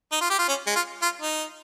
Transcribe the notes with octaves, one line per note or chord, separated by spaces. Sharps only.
D#4
F4
G4
F4
C#4
G#3
F4
F4
D#4